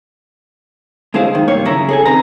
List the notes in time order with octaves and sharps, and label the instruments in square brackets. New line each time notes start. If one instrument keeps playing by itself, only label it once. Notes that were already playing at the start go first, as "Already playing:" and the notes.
[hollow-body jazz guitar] D2 G#3 E4 G#4 C5 F5
F#2 D#3
C#2 G2 D#3 A#3 C#5
F#2 C#3 C#4 E4 A#5
G#4 A4 G#5
B1 C3 D#3 B4 A#5